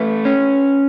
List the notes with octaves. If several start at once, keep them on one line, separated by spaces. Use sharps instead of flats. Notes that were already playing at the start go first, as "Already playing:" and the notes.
Already playing: A3 B4
C#4